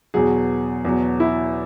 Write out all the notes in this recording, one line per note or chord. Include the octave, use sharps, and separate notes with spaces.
E2 B2 F#3 G#4
E2 B2 F#3
E4